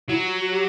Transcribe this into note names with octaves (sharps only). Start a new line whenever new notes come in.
F#3 E4
F#4
F#4
G4